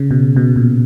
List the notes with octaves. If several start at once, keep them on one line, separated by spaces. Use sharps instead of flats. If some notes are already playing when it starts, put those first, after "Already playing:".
Already playing: C#3
B2
B2
A#2